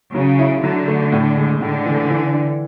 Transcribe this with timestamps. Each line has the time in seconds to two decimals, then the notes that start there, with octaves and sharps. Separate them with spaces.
0.15 C#3 F#3
0.39 E4
0.64 D3 F#3
0.88 A3
1.12 A2
1.37 G#3
1.60 A2 D3
1.85 E3
2.10 E3
2.34 D4